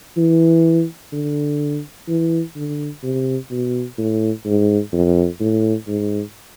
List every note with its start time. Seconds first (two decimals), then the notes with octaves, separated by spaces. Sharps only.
0.17 E3
1.13 D3
2.08 E3
2.56 D3
3.03 C3
3.51 B2
3.98 A2
4.46 G#2
4.93 F2
5.40 A2
5.88 G#2